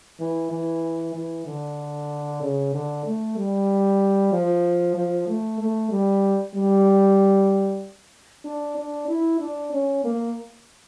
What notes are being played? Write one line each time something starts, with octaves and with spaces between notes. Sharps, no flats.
E3
E3
E3
D3
C#3
D3
A3
G3
F3
F3
A3
A3
G3
G3
D4
D4
E4
D4
C#4
A#3